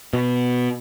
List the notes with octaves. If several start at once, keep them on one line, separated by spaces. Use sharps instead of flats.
B2